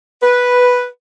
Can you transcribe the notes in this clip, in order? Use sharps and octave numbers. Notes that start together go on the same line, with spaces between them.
B4